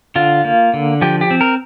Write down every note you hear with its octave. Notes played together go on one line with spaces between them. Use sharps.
D3 F4
A#3
D3
F3 G4
G4
C4
A#4